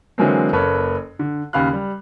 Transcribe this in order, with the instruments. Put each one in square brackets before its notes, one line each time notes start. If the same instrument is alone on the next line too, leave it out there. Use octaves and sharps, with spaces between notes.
[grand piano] D3 E3 F#3 G#3 A#3 C4
F#1 A#3 A4 B4 C#5
D3
D#2 C#3 F5 B5 F#6
G3